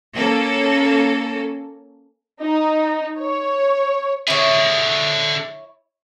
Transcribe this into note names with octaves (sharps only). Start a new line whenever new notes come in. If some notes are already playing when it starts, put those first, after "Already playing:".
A#3 C#4 A4
D#4
C#5
D3 E4 G#4 C#5